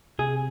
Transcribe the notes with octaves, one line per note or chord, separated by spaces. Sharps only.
C3 G#4